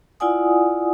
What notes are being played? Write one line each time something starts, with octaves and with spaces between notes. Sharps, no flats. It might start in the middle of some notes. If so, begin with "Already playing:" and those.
E4 F4 D5 F#5 G#5 D#6